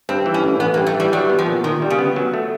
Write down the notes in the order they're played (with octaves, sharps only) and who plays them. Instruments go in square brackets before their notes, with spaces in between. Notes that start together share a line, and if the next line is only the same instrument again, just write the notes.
[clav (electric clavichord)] G2 [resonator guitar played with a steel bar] C4
[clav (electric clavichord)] E3
[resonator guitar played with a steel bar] C#4
[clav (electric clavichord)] A1
[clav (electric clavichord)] A1 [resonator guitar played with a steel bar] B3
[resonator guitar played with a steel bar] A#3
[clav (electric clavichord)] G2
[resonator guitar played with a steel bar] A3
[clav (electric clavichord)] E3
[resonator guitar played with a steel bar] G3
[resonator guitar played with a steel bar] F#3 [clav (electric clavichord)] G3
[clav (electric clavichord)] B3
[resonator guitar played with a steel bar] F3
[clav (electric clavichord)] A#2
[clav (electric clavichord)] A#2 [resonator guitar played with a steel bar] D#3
[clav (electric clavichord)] G3
[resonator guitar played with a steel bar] C#3
[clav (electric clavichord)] B3
F#3
A3